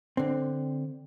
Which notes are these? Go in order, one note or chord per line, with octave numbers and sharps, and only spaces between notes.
D3 C4